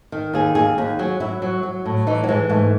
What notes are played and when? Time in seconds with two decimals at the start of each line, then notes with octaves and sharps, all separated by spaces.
0.12 D#3
0.33 D#2 G#4
0.55 D#2 G#4
0.78 D#2 G#4
0.99 F#3 G#4
1.20 F#3 E4
1.42 F#3
1.63 F#3
1.86 A2
2.07 E3 D#4
2.24 F#3
2.28 E3 G#3
2.50 G#2 A3